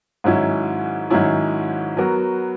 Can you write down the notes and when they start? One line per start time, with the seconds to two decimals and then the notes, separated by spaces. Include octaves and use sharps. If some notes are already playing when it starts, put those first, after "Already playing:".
0.24 G#2 D#3 F#3 C#4 E4
1.10 G#2 D#3 F#3 C#4 E4
1.97 F#3 B3 F#4 A#4